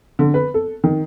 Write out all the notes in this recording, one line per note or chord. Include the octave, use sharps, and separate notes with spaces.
D3
B4
A4
D#3